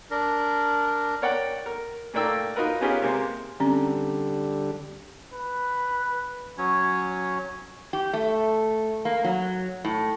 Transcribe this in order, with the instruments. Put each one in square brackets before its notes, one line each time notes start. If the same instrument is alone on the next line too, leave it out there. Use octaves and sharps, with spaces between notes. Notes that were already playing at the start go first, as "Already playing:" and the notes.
[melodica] D4 A#4
[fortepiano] A#4 C#5 D5 F#5 G5
A#4
A#2 A3 A#3 D5 G5 E6
D#4 F4 F#4 A#4 B4
B3 C#4 F4 G4 G#4 A#4
C3 G#3 A#3 C4
[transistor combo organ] D3 G3 [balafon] C4 C#4 A#5
[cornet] B4
[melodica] F#3 C#4 C#5
[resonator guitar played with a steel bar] G4
A3
A#3
F#3
A2